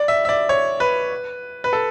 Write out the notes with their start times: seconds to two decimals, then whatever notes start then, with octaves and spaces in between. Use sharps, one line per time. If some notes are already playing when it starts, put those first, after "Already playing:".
Already playing: D5
0.08 E5
0.25 E5
0.29 D5
0.49 C#5
0.80 B4
1.64 B4
1.73 A4